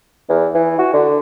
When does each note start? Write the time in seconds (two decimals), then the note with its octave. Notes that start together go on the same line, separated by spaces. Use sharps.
0.29 E2
0.55 E3
0.79 F#4
0.93 D3